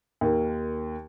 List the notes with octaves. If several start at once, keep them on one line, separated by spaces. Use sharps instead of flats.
D#2 A#3